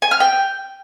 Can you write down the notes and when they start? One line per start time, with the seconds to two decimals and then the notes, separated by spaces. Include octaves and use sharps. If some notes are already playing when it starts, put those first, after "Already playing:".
0.02 G#5
0.11 F6
0.20 G5